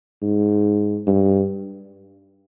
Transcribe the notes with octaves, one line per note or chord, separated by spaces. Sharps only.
G#2
G2